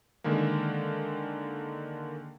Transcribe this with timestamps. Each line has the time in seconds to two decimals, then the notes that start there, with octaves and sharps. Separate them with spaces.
0.24 D3 D#3 G#3 A#3